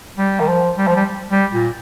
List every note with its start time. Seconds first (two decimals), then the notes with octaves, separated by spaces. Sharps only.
0.17 G3
0.40 D#3
0.48 F3
0.77 G3
0.87 F3
0.96 G3
1.30 G3
1.53 A#2